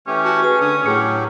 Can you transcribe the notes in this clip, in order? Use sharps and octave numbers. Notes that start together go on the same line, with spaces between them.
E3 A3 C#4 G4
F#4 A5
G#4 B4
D3 D#6
A2 F#3 G4 G#4 F6 C#7